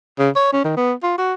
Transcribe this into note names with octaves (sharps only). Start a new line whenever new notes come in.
C#3
C#5
C#4
D#3
B3
F4
F#4